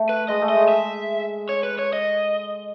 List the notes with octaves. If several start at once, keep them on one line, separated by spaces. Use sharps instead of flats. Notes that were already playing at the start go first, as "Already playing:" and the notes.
Already playing: A3
B4
G#3 D#5
A3
D#5
G#3
E5
C#5
B4
C#5
D#5